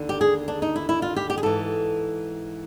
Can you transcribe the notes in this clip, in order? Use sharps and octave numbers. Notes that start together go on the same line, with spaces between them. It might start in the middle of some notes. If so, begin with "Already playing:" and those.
Already playing: D#2 D3
G4
G#4
D4
D#4
E4
E4
F4
G4
G4
G#4
G#2 E3 A4